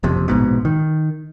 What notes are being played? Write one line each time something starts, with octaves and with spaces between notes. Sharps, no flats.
F#1 F2 C3
A#1 G#2 B2
D#3